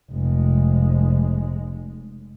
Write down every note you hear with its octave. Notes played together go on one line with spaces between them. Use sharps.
F1 G#3